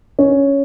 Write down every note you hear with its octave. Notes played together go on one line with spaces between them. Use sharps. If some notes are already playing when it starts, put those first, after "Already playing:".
C#4